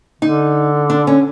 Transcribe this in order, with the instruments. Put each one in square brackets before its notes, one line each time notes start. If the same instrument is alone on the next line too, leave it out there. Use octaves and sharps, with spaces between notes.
[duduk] D3 [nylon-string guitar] D#4
[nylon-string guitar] D4
C#4